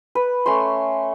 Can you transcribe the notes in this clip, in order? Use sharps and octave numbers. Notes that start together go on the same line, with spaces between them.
B4
A3 C#4 C#5 C6